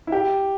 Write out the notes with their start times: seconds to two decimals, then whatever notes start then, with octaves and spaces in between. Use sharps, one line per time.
0.07 E4
0.12 G4